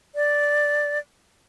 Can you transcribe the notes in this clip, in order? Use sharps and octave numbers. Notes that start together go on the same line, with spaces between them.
D5